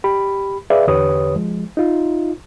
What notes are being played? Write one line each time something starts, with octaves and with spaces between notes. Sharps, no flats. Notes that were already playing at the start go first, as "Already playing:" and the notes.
G4 B5
G#4 B4 D5 E5 F5
E2 D3 G4 B4 C#5 D#6
F3 G#3
D#4 F4